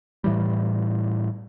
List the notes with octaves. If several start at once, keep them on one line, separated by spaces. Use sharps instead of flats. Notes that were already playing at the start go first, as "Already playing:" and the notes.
A2 E3 G3